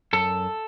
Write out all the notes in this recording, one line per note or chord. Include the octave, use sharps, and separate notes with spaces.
F#2 A4